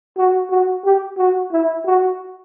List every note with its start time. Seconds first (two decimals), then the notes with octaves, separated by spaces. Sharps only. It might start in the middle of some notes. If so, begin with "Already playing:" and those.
0.17 F#4
0.50 F#4
0.84 G4
1.18 F#4
1.52 E4
1.85 F#4